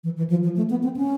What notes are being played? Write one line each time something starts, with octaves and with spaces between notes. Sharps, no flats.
E3
E3
F3
F3
A3
B3
C4
C#4